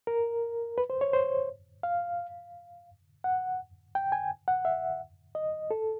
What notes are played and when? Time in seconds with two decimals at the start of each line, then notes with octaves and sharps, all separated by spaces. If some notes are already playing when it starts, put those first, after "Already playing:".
0.07 A#4
0.78 B4
0.90 C5
1.01 C#5
1.13 C5
1.83 F5
3.24 F#5
3.95 G5
4.12 G#5
4.48 F#5
4.65 E5
5.35 D#5
5.71 A4